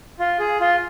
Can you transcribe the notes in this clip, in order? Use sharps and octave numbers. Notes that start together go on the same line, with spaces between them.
F4
G#4
F4